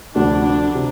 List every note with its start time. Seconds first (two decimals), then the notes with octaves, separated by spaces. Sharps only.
0.15 D2 C3 F3 D4
0.44 D4
0.75 C3